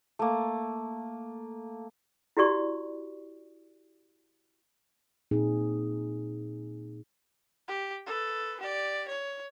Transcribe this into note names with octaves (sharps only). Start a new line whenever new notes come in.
A3 A#3
E4 F#4 G4 D5 C#6
A#2 C4 D#4 G#4
G4
A4 B4
G4 D5
C#5